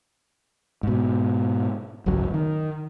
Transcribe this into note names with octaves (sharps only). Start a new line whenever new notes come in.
G#2 B2
G#1 C#2 F#2 F#3
D#3